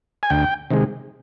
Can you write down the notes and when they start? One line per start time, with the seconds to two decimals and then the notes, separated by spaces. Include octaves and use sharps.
0.23 G#5
0.30 D2 G5
0.70 C3 D#3 G#3